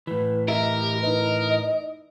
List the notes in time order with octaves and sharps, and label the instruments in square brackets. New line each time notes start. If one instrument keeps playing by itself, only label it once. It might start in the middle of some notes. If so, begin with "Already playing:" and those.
[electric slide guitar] A2 E3 [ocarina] B4
[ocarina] G4 [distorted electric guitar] A#4 [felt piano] D#5 E5
[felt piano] D#4 E4 B4 [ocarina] D#5